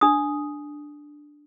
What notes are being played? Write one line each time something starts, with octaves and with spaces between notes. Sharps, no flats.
D4 D#6